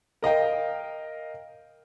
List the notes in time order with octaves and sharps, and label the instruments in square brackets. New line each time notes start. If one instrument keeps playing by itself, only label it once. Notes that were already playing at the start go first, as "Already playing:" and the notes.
[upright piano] A#4 D#5 F5 G5